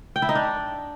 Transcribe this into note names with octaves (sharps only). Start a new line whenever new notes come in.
G5
E4
D#4
D4